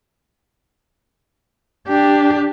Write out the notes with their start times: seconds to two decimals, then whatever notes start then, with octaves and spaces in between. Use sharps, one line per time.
1.88 D4 G4